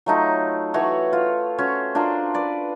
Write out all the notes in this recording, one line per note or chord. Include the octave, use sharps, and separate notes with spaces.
F#3 A3 D#4 F4
E3 A3 F#4 C#5
F4
C#4 F#4 C5
D4 F4 A#4 C5
B4 D5